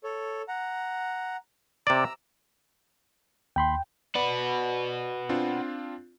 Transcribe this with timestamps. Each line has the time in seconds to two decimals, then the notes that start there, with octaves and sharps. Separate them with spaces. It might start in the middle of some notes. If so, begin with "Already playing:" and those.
0.04 A4 C#5
0.48 F#5 A#5
1.87 C3 D5 A#5 E6
3.56 D#2 G5 B5 C6
4.15 F#4 B4 D5 B5
5.29 C4 D4 F4